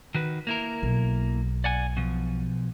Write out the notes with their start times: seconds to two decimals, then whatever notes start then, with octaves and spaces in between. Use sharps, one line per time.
0.15 D#3 F#4 B4
0.47 A#3 E4 A#4
0.83 B1
1.64 D5 F#5 G#5
1.97 B2 F3